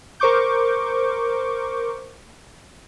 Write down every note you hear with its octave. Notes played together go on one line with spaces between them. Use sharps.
A#4 C5 C#6 D6 G6